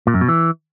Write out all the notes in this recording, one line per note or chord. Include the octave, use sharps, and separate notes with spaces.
A#2
F#2
B2
E3